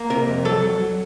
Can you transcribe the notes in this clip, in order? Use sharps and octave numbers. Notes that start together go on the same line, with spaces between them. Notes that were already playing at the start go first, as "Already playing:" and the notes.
Already playing: A#3
C3 A#4
F2
F#3 A4
F#3
F#3